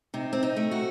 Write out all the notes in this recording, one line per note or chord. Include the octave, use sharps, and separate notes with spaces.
C3 D#4
C4
D#4
A3
F#4